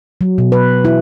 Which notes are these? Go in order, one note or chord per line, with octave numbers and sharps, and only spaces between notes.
F#3
B2
B4
E4